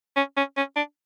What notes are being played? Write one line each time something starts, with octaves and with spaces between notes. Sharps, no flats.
C#4
C#4
C#4
D4